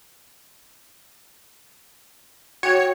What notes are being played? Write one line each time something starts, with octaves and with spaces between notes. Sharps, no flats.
F#4 C#5 G5 G#6